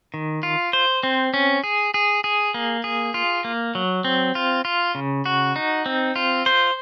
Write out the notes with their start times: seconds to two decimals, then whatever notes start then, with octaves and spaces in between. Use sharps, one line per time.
0.14 D#3
0.43 F4
0.73 C5
1.03 C4
1.34 C#4
1.64 G#4
1.94 G#4
2.24 G#4
2.54 A#3
2.84 G#4
3.14 F4
3.44 A#3
3.75 F#3
4.05 C4
4.35 F4
4.65 F4
4.95 C#3
5.26 F#4
5.56 D#4
5.86 C4
6.16 F4
6.46 C5